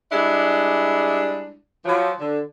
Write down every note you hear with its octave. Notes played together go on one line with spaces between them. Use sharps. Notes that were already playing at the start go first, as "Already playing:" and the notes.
G3 G#3 D4 E4
F3 F#3
D3